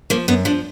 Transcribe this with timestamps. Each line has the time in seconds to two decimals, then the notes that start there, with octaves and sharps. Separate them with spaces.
0.10 F3 A#3
0.28 F#2 B3
0.45 F3 D4